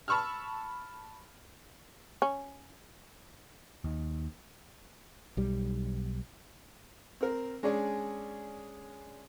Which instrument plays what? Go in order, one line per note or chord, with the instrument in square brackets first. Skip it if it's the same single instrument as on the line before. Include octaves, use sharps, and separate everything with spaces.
[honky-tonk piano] A5 B5 C#6 E6 F6
[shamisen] C#4
[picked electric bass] D#2
[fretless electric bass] B1 G3
[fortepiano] C4 A#4
G#3 C#4 D4 G#4 D5